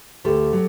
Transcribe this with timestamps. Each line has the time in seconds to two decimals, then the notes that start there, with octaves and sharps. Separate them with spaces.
0.24 D2 G4 A4
0.53 F#3